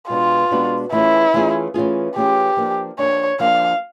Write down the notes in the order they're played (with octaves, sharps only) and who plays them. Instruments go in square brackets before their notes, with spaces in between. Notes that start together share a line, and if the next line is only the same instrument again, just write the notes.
[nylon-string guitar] B2 G#3 B3 D4 F#4 [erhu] F4
[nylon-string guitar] B2 G#3 B3 D4 F#4
[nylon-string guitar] E3 A3 C#4 F4 G#4 [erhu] E4
[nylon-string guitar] E3 A3 C#4 F4 G#4
E3 A3 C#4 F4 G#4
[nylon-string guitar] E3 A3 C#4 F4 G#4 [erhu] G4
[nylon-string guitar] F3 A#3 D4
[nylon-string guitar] F3 A#3 D4 [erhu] C#5
[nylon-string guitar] F3 A#3 D4 [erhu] F5